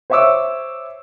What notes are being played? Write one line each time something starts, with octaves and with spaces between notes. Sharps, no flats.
C5 C#5 E5 C#6 D6 E6